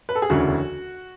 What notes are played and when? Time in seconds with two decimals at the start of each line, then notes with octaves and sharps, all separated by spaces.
0.09 B4
0.15 A4
0.22 G#4
0.30 E1 D2 C#3 E3 F#4